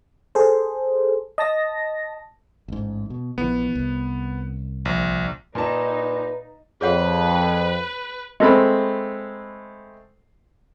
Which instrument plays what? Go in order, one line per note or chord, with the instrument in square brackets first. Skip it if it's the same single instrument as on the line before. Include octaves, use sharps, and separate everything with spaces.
[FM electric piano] G#4 A4 C5
D#5 A5 A#6
[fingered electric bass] A1 G#2
B2
[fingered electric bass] A#1 D#3 E3 [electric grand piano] B3
[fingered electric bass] C2
[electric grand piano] A#1
[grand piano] A#2 A5 [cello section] D#4 [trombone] B4
[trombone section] F2 [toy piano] G#4 C#5 F#5 [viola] B4
[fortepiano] G#3 A3 C4 B5